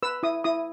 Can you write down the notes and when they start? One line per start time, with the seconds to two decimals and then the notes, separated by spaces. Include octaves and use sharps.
0.03 B4 E6
0.23 E4 D#6
0.44 E4 D#6